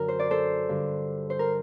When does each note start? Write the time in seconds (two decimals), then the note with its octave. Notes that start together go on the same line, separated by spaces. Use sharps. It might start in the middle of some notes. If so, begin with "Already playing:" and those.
Already playing: F#2 D3 A#4
0.08 C5
0.19 D5
0.30 A4 C5
0.69 G2 D3
1.30 C5
1.39 A#4